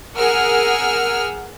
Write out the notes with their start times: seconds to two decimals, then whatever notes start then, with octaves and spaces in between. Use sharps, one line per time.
0.17 G#4 A#4 F#5 E6 F6